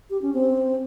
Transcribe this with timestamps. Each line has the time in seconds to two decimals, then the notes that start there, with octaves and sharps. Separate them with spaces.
0.10 G4
0.22 C#4
0.34 C4